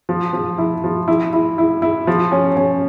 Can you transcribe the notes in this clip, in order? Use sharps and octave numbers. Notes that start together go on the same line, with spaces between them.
F3
F3
E4
F3
E4
E4
E4
E4
F3
C#4
C#4